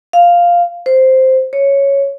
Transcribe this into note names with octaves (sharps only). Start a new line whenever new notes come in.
F5
C5
C#5